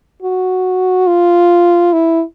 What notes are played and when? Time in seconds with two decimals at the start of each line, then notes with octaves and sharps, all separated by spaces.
0.22 F#4
1.07 F4
1.93 E4